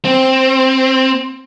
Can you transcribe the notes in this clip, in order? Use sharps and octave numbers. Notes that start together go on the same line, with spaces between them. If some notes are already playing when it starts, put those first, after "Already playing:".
C4